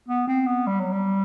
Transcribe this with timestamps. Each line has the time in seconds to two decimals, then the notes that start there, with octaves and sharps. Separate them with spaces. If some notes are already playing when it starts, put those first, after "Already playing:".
0.08 B3
0.28 C4
0.47 B3
0.67 G3
0.80 F#3
0.92 G3